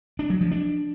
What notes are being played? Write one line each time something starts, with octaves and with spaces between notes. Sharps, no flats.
D4
F#3
F3
D4